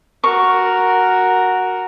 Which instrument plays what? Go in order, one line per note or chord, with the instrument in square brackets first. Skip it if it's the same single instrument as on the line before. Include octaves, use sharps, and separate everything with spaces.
[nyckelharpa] F#4 A#4 [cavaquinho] C#6